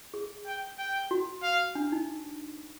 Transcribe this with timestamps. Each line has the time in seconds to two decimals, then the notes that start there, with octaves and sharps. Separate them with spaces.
0.14 G#4
0.46 G5
0.79 G5
1.11 F#4
1.43 F5
1.75 D4
1.92 D#4